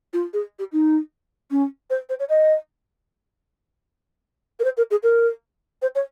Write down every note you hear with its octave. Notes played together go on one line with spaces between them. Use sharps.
F4
G#4
G4
D#4
C#4
C5
C5
C#5
D#5
A#4
C5
A#4
G#4
A#4
C5
C#5